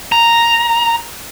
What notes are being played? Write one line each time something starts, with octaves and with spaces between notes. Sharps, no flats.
A#5